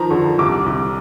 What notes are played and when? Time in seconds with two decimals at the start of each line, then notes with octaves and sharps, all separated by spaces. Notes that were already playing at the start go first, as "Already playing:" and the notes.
Already playing: D#3 F3 A#5
0.11 D3
0.38 C2 D6
0.66 C2